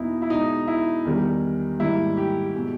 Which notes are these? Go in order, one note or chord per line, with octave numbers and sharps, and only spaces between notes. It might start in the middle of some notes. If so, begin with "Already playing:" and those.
Already playing: E2 B2 A#3 D#4 E4
E4
B2 G#3 D#4
E4
E2 D#3 G3
G#2 D#3 G3 A#3 E4
G4
B2 G#3